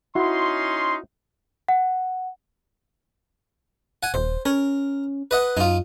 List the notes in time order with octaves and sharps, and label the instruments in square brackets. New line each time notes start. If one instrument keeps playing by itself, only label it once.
[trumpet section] C#4 D#4 C6 [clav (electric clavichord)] E4 F#4
[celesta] F#5
[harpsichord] F#5 G#5
[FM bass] D#1 [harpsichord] C5
[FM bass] C#4 [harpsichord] A#4
[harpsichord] B4 D#5 F#5
[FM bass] F#2 [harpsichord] D#4 F4